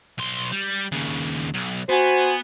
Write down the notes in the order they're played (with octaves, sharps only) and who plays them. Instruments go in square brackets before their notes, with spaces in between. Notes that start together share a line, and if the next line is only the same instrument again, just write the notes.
[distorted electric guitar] B1 C6
G3
D#2 C#3
B1
[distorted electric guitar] B3 [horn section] F#4 C5 G#5